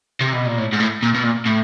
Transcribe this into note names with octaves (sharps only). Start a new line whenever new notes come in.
C3
B2
A#2
A2
G#2
A2
A#2
B2
A#2
A2